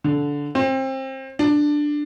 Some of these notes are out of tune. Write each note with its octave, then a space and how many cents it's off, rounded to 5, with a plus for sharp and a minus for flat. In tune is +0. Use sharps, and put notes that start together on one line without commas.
D3 -20
C4 +25
D4 +10